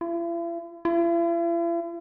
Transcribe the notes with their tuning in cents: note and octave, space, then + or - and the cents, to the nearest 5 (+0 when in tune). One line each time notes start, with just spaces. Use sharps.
E4 +45
E4 +45